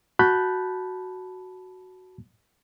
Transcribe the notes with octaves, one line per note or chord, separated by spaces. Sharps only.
F#4 A5 B5 F#6 G6